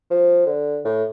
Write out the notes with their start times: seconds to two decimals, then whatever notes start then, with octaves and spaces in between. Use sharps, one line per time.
0.10 F3
0.46 D3
0.85 A2